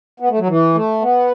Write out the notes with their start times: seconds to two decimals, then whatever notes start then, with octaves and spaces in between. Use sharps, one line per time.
0.20 B3
0.30 A3
0.39 F#3
0.48 E3
0.75 A3
1.02 B3